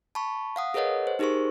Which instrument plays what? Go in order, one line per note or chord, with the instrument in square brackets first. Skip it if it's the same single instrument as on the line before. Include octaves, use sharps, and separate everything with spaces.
[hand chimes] A5 B5 C#6
F5 F#5 D#6
G#4 A#4 B4 C#5 D#5 F#5
C5
D#4 G4 G#4 A#4 C5 C#6